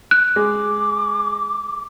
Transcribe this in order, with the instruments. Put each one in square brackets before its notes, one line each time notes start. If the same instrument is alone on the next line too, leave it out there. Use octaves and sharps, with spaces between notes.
[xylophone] F#6
[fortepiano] G#3 [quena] D6